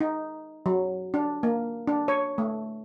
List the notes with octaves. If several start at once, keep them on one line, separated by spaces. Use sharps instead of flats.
D#4
F#3
D4
A#3
D4
C#5
A3